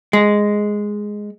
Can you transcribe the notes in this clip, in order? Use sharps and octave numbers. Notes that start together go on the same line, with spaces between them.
G#3